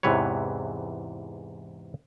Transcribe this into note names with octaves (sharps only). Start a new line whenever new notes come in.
E2 G#2 C3 E3 B4 C#5